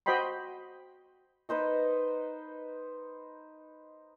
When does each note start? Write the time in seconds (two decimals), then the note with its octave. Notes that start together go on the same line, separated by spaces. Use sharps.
0.06 F#4 C5 D#5 G5 B5 C6
1.49 D#4 B4 C5 D#5